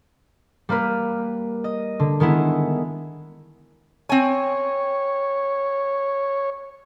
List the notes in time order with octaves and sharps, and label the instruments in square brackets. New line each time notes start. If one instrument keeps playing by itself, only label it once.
[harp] G3 A#3 A#4 B4
D#5
D3
D#3 G#3 B3 E4
[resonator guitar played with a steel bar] C4 G#5 [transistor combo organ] C#5